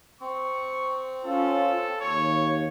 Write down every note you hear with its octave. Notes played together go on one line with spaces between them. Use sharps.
C4 C#6
C#4 F4 A4
D#2 C#5